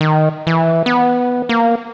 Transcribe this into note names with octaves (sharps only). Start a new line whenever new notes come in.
D#3
E3
B3
A#3